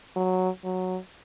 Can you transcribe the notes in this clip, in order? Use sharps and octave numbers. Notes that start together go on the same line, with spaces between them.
F#3
F#3